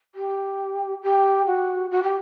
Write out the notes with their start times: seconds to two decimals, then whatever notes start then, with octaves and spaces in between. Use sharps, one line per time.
0.15 G4
1.03 G4
1.47 F#4
1.91 F#4
2.03 G4